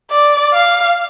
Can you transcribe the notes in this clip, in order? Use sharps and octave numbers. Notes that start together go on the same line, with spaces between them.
D5
F5